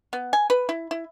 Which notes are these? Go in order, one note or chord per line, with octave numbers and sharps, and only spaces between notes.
B3
G#5
B4
E4
E4